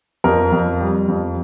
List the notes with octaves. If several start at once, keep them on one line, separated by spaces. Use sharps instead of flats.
F2 A#4
F2
G3
F2